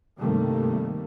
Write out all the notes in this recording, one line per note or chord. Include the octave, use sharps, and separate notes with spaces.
G2 C3 D#3 G3 A3 A#3